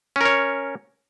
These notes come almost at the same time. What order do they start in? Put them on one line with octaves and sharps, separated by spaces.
C#4 A#4 C#5